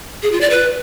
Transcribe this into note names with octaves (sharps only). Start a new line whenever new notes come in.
G#4
F4
D5
B4